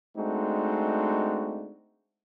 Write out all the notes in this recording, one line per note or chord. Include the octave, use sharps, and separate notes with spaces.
G#3 A3 C4 D4 D#4 F#4